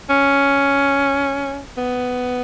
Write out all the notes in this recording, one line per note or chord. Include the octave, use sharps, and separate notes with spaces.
C#4
B3